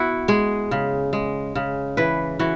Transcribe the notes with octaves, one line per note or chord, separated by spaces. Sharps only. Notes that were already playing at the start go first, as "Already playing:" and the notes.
Already playing: B3 E4 F#4
G#3 G#4
C#3
G#3
C#3
E3 B4
E3 F#4